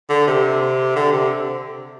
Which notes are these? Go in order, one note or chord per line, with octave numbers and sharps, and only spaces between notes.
D3
C3
D3
C3